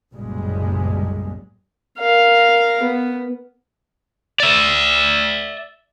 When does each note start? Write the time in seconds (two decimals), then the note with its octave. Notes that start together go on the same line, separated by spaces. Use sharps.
0.14 F#1 B1 F#2 A#2 G3 G#3
1.99 A#4 F5
2.83 B3
4.40 D5 E5